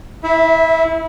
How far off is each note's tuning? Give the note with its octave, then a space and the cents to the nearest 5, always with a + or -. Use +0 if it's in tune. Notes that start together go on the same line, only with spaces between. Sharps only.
E4 -25 E5 +0